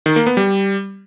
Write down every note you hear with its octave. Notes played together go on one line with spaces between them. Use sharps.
D#3
A#3
B3
G3